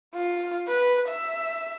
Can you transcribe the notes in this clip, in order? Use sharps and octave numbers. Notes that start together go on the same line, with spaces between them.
F4
B4
E5